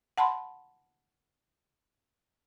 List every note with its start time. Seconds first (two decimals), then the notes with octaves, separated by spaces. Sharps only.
0.18 F#5 A5 B5 C6